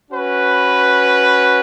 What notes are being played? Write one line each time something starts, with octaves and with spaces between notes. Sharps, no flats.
C#4 F#4 B4